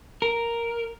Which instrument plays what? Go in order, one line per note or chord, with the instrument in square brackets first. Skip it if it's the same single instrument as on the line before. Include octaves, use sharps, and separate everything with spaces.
[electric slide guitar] A#4